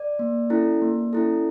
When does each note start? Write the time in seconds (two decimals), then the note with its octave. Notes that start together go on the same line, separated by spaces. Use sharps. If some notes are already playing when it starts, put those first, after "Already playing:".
Already playing: D5
0.19 A#3
0.50 C#4 E4 A4
0.82 A#3
1.13 C#4 E4 A4